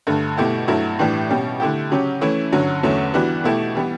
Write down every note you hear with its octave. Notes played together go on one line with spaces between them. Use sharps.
G2 D3 A3
B2 A3 E4 G4
G2 F#3 A3 E4
A2 E3 G3 D4 G4
B2 G3 C#4
D3 A3 E4 G4
C#3 F#3 C#4 G4
E3 A3 C#4 E4
G2 D3 F#3 C#4
E2 D3 F#3 A3 C#4
E3 G3 B3 D4 F#4
B2 A3 E4 G4
E3 G3 B3